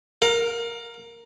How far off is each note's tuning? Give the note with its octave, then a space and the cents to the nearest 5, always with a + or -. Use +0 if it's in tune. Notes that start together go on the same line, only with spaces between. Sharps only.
A#4 +0 F5 +40